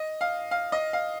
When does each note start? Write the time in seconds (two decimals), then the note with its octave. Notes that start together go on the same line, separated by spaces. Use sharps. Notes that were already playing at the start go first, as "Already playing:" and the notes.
Already playing: D#5
0.21 F5
0.51 F5
0.72 D#5
0.93 F5